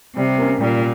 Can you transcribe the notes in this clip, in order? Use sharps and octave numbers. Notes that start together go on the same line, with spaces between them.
C3 G3
A#3 C#4
A#2 G3